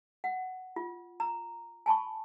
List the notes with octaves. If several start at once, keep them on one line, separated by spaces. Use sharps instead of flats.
F#5
F4
A#5
G#5 A5 B5 C#6